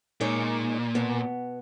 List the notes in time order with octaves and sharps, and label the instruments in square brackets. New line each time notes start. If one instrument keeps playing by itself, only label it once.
[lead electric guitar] A#2 [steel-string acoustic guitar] G#3 D#4 C#5
[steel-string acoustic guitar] B2 B3